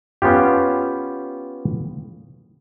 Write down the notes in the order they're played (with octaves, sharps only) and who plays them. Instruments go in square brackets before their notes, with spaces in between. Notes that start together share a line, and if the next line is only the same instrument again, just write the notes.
[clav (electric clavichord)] B3 C#4 F4 G4